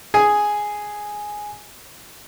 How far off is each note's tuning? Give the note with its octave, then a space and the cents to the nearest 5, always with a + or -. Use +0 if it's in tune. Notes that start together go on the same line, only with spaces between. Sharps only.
G#4 +0 G#5 +0